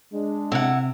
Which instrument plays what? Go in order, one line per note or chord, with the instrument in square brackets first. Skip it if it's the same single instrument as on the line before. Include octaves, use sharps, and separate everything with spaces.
[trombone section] G#3 D4
[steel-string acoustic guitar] C3 [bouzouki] E4 F#5